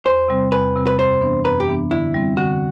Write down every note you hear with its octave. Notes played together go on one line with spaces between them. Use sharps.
E2 C5
C3 G3 C4
E2 B4
C3 G3 C4
B4
F#2 C5
E3 B3 D4
F#2 B4
G4
E3 B3 D4
D3 E4
G3 C4
D3 F#4